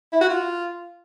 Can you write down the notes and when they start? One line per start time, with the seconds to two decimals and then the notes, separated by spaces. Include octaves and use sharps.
0.12 E4
0.21 F#4
0.29 F4